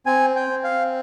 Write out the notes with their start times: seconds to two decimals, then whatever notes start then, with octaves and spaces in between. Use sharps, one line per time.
0.06 C4 G#5
0.36 G5
0.50 C4
0.64 F5